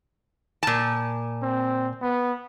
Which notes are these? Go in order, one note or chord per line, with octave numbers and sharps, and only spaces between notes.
A#2 A5
C4
B3